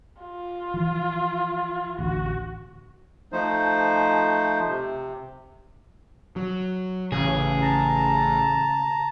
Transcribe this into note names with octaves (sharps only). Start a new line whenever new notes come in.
F4
E3 F3
A1 D2 F#4
F3 A3 D#4 C5
C3
F#3
A1 C#3 G#4
A5 A#5